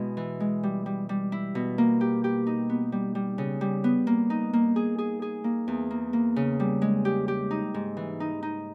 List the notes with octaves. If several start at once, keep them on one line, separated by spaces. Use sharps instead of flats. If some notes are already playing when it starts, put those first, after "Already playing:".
Already playing: B2 G#3 E4
E3
G#3
G3
G3
G3
E4
B2
A#3
G4
G4
D#4
B3
G3
G3
C#3
G3
B3
A#3
D#4
A#3
G#4
G#4
G#4
A#3
E2
A#3
A#3
C#3
G3
G#3
G4
G4
D#4
G#2
E3
D#4
D#4